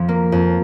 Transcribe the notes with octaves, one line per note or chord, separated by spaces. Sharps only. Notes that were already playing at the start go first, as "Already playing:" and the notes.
Already playing: F2 F3
A#3
F2